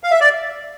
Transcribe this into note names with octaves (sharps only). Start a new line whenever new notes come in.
F5
E5
D5